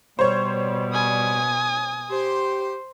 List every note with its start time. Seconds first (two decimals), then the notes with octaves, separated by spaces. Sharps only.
0.19 B2 G3 C5 C#5
0.93 G#5 D#6
2.10 G4 C5 C6